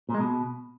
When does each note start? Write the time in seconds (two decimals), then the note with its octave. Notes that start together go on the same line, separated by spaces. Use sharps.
0.09 A#2
0.14 G#3
0.20 B2